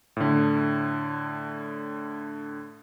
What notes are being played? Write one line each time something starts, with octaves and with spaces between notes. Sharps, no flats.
A2 D3